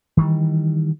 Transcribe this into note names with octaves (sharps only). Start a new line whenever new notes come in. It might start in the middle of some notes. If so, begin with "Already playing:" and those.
D#3 E3 G3